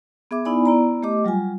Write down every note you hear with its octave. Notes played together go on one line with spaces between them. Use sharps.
B3 G#4 E5 D6
B3 D#4 E4 D5 G#5 B5
B3 E4 D5 A#5
A3 G4 D#5 D6
F#3 G3 F4 G#5